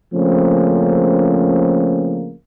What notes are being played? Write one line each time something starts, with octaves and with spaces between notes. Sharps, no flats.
C#3 F3 A3 A#3 C4 C#4